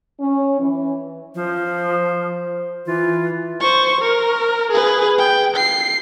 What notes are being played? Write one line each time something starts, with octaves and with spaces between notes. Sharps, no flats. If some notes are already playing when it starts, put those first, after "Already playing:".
C#4
E3
F3 C5
E3 F4
C5 C#6
A#4
G#4 B4
G5
C7